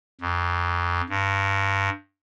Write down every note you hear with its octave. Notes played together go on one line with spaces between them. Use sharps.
F2
G2